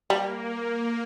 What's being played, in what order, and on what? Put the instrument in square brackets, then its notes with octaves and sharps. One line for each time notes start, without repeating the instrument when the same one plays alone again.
[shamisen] G3 [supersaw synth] A#3